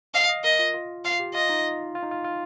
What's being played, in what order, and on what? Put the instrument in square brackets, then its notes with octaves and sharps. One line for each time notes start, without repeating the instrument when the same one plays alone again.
[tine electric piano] D#5 [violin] F5
[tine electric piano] D#5
[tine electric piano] A#4 [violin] D#5
[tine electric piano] F4
F4
[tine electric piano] F4 [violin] F5
[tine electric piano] G4
[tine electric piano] F4 [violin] D#5
[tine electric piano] D#4
F4
D#4
F4
F4